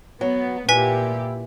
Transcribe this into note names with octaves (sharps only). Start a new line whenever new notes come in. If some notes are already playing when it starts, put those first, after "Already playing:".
F#3 B3
A#2 E4 G4 B4 G#5 B6